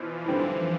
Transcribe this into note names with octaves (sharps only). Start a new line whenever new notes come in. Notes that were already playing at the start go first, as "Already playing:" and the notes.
Already playing: B2 E3 F3
D3 G3 C4 E4